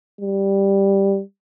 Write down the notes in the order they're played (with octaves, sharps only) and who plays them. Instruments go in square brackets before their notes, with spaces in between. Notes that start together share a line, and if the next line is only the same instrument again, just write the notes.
[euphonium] G3